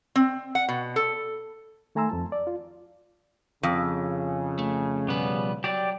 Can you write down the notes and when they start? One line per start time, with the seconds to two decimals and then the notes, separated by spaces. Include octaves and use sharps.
0.16 C4
0.55 F#5
0.69 B2
0.96 A4
1.95 D#3 A3 G#5 A#5 C6 E6
2.09 F2 F3 A5
2.32 D5
2.47 F4
3.63 F2 C#3
4.59 A3
5.08 B2 F3 G3 B3 B4
5.64 F#3 G4 D5